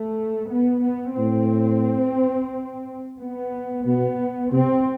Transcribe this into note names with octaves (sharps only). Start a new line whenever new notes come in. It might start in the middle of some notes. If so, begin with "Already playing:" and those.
Already playing: A3
B3
B3
A2 C4
B3
B2 B3
C3 C4